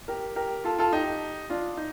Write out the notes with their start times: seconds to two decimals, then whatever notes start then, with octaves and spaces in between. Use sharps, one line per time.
0.08 G4 A#4
0.36 G4 A#4
0.64 F4 A4
0.78 F4 A4
0.93 D#4 G4
1.50 D4 F4
1.77 D#4